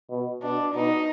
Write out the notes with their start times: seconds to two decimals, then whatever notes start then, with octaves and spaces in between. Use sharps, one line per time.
0.10 B2
0.42 B2 D4
0.74 B2 D#4